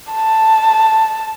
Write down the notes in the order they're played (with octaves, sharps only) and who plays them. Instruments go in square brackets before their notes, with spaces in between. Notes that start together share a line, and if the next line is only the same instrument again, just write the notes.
[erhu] A5